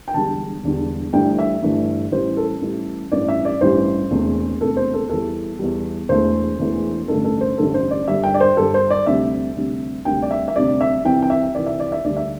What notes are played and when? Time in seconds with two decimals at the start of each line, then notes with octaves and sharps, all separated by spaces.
0.08 G5
0.14 E1 E2 D3 G3 A5
0.63 E1 E2 D3 G3
1.13 G1 G2 E3 A3 G5
1.39 E5
1.62 G1 G2 E3 A3
2.12 A1 A2 E3 G3 C5
2.37 A4
2.62 A1 A2 E3 G3
3.12 A1 G2 E3 G3 D5
3.28 E5
3.45 D5
3.61 A1 G2 E3 G3 C5
4.11 E1 E2 C3 A3
4.61 E1 E2 C3 A3 A4
4.77 C5
4.94 A4
5.09 E2 E3 G3 A4
5.59 E2 E3 G3
6.09 E1 E2 E3 A3 C5
6.59 E1 E2 E3 A3
7.08 A1 G2 D3 A3 A4
7.25 A4
7.41 C5
7.58 A1 G2 D3 A3 A4
7.74 C5
7.91 D5
8.07 G1 G2 G3 E5
8.23 G5
8.34 D5
8.40 C5
8.57 G1 G2 G3 A4
8.74 C5
8.90 D5
9.07 D2 C3 G3 E5
9.56 D2 C3 G3
10.05 D2 C3 G3 G5
10.22 D5
10.31 E5
10.48 E5
10.55 D2 C3 G3 D5
10.81 E5
11.05 C2 C3 E3 G5
11.22 G5
11.30 E5
11.55 C2 C3 E3 D5
11.66 E5
11.80 D5
11.92 E5
12.04 D2 D3 G3 D5
12.17 E5